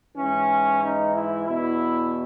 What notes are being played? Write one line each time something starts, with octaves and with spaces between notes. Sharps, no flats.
G#2 E3 C#4
D#4
E4
E2 B2 E4